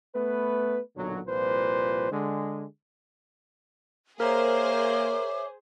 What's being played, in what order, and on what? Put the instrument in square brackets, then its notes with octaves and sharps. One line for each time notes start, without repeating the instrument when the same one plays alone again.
[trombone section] A3 B3 B4
B1 A#2 D3 F#3
C2 A#2 F3 B4 C5
D3 G#3
[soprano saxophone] A#3 [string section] G#4 C5 [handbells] A#4 A#5 [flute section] C#5 E5 D6